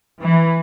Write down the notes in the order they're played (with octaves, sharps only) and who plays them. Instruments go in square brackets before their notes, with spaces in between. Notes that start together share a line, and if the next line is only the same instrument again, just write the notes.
[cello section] E3